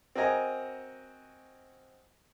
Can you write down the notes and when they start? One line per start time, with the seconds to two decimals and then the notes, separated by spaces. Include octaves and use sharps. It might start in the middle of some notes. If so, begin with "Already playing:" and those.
0.16 C4 F#4 A#4 D#5 G#5 A#5